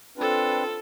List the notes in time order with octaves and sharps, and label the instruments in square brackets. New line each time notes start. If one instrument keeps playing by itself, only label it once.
[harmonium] C4 D4 B4 [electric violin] F4 A4